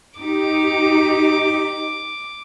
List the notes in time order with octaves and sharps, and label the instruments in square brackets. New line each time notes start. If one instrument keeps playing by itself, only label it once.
[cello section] D#4 G4 [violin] D6